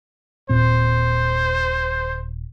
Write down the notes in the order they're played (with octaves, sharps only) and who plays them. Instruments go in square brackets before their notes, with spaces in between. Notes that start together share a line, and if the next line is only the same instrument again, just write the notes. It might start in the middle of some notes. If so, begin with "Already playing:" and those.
[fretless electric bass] D#1 A#2 C4 [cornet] C5